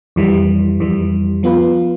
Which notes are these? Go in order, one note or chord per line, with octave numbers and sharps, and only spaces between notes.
F2 E3 G3
F2 E3 G3
F3 B3 F4 B4